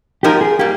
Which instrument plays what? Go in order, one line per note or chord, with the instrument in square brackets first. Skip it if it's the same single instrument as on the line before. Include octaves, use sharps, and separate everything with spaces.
[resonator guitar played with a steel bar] F3 A#3 D#4 A#4 [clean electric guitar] G4
[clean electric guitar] G#4
[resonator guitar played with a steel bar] G3 A#3 [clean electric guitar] G4